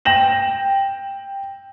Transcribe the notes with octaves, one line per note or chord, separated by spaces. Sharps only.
G5 A#6 E7 F#7